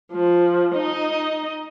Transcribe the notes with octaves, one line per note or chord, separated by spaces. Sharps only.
F3
D#4 D#5